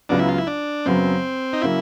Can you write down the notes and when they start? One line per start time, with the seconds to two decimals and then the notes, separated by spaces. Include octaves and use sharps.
0.09 C#2 C#3 F#3 B3 D4
0.19 E4
0.29 F4
0.38 E4
0.47 D4
0.86 F#2 C#3 F#3 B3 C4
1.53 D#4
1.62 C#3 F#3 A#3 E4